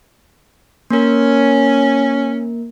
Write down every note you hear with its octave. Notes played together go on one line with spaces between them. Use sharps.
A#3 C#4 A#4